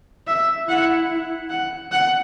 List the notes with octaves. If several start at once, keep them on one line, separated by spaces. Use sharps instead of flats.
E5
E4 F#5
F#5
F#5